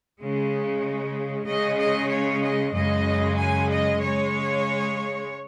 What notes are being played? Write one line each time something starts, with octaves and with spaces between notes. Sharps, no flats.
C#3 G#3
C#3 G#3 D#5
D#5
C#5
D#5
F#2 C#3 G#3 D#5
G#5
D#5
C#3 G#3 C#5